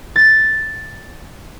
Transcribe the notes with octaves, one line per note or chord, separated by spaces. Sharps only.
A6